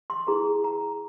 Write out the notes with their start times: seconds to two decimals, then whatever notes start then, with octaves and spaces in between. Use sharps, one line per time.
0.10 C6
0.27 E4 G#4 B4 A#5
0.64 A#5